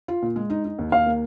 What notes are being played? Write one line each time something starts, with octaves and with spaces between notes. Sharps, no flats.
F4
A#2
G#3
D#4
D#4
D#2
D#2 F5
A#3